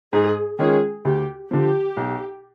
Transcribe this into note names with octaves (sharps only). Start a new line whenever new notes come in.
G#2 G#4
D#3 G#3 C#4 F4 G#4
D2 G4
D3 F3 G4
B1